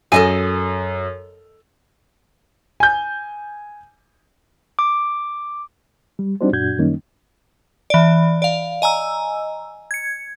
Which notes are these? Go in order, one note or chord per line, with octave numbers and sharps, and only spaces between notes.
F#2 A4 D#5 G#5
G#5 G6
D6
G3
G3 C4 D4 D#4 F#4 C5
F#2 A#2 D4 F#4 G6 G#6
F#2 D#3 G3 A#3 C#4 D#4
E3 D5
D5 F5
D#5 G#5 A#5 E6
G#6 C#7